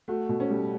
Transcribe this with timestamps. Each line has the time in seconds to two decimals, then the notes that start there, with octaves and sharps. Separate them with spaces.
0.08 A3 F#4
0.29 B2
0.40 C#4
0.50 G3